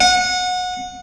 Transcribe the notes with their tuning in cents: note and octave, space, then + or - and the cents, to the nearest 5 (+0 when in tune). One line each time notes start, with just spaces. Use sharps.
F#5 -25